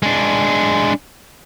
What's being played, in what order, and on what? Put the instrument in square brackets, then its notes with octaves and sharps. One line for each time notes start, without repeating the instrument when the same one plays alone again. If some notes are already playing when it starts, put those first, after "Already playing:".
[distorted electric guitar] G#3 D4